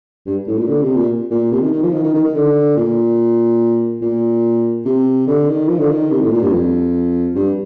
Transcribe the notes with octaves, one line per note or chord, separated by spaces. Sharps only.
G2
A2
A#2
D3
C3
A#2
A#2
C3
D#3
D#3
F3
D#3
D#3
D#3
D#3
D3
A#2
A#2
C3
D3
D#3
F3
D3
D#3
C3
A2
A#2
G2
F2
G2